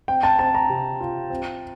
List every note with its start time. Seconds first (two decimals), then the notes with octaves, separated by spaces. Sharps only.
0.08 C4 G5
0.23 A5
0.39 C4 A5
0.55 A#5
0.69 C3
1.00 F4
1.30 C4